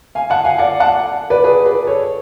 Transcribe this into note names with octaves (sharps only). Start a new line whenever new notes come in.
F5 G#5
F#5 A5
F5 G#5
D5 F#5
F#5 A5
B4 D5
G#4 B4
G#4 B4
A4 C#5